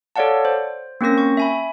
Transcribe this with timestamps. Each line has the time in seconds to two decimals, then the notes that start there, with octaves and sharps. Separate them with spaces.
0.16 A4 C#5 D5 F5 F#5 A5
0.45 C5
1.01 A#3 C4 C#4 A#4 A#6
1.18 C#6
1.37 E5 G#5 B5